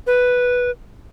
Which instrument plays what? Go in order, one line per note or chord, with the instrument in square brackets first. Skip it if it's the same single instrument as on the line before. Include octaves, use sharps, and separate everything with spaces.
[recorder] B4